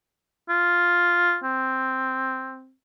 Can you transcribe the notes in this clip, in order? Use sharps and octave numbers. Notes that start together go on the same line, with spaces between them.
F4
C4